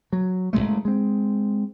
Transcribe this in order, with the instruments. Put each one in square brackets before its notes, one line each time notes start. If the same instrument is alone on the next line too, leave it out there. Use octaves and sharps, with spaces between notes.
[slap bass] F#3
F#1 F2 G#3 A3
G#3 C4